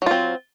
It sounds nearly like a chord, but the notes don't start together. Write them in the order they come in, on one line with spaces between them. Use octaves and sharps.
F#3 F4 C4